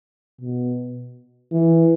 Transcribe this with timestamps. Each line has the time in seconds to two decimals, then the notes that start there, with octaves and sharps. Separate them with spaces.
0.41 B2
1.52 E3